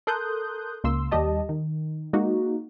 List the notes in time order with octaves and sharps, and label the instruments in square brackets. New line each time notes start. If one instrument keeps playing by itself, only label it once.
[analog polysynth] A4 A#4 C6 D#6 F#6 G6
C#2 A#3 C6 E6
D#2 G3 G4 D#5 A5
D#3
G#3 A#3 D#4 F#4